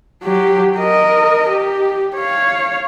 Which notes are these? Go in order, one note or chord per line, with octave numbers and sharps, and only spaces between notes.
F#3 G4
A#4 D#5
G4
C#5 F5